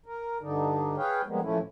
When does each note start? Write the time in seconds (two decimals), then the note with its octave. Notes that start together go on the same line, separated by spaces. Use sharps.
0.06 A#4
0.41 G2 D3 D4 D#4
0.97 G#4 B4 C#5 F5 G5
1.26 F3 G3 G#3 A#3 B3
1.41 A#2 E3 F3 A3 C#4 E4